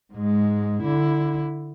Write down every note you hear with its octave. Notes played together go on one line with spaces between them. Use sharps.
G#2 G#3
D3 E4